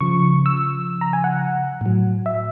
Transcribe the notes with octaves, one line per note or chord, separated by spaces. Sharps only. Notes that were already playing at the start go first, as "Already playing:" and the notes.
C#3 F3 C#6
E6
A#5
G#5
F#5
A2 F#3
E5